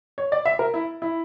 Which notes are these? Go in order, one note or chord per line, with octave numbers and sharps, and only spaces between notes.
C#5
D5
E5
A#4
E4
E4